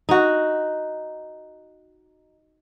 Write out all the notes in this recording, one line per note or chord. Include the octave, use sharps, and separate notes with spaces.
D#4 F#4